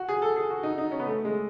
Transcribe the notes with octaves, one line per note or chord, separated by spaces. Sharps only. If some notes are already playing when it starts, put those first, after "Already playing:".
Already playing: F#4
G#4
A4
G#4
F#4
D#4
D#4
C#4
B3
A3
G#3